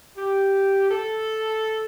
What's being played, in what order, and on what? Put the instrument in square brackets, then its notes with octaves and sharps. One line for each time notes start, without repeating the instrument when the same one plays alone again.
[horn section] G4
A4